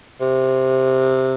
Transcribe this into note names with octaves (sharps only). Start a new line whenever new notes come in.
C3